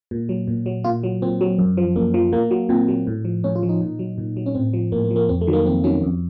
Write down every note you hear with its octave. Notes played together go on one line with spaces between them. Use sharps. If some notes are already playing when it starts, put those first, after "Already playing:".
A#2
F#3
A#2
F#3
A#2 F4
F#3
A#2 C4
F#3
F#2
F3
F#2 A#3
F3
A#2 A#3
F#3
A#2 C4
F#3
A2
F3
A2 C#4
F4
F3
D#4
A#2
F#3
A#2
F#3
C#4
A2 C4
F3
A2 A#3
A#3
F3
A#3
F2 C4
A3
D#3 F#3
A#3
F2 C4
D#3 F#3 C#4
F2